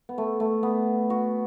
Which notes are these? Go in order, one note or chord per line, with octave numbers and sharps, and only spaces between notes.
B3
A3
A3
B3
F#4